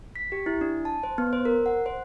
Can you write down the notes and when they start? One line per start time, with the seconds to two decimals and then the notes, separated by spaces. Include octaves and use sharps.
0.16 B6
0.32 G4
0.46 E4
0.61 D4
0.85 A5
1.03 C5
1.18 B3
1.33 C5
1.45 A#4
1.66 F#5
1.86 C5